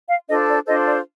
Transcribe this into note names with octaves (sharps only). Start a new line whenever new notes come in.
F5
D4 F4 A4 C5 D#5
D5
D4 F4 A4 C5 D#5
D5